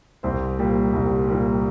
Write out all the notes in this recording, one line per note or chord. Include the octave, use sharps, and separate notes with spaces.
C2 C5
A#2 G3
C2
A#2 G3